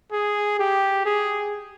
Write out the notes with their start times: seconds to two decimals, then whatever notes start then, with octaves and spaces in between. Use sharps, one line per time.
0.12 G#4
0.59 G4
1.06 G#4